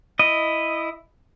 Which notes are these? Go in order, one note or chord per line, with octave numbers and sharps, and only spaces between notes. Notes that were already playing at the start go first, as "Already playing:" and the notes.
E4 D#5